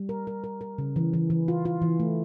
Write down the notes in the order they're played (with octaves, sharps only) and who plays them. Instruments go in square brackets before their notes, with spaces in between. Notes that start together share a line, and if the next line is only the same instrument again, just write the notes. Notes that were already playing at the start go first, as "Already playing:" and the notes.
Already playing: [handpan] G3
A#4
A#4
A#4
A#4
C#3
E3
E3
E3
F4
F4
E3
A3